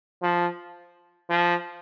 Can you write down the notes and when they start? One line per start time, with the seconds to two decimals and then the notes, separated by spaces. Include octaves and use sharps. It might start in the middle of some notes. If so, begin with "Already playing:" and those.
0.22 F3
1.30 F3